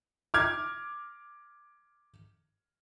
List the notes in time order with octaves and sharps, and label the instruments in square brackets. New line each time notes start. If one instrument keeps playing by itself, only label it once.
[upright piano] D6 F6 G#6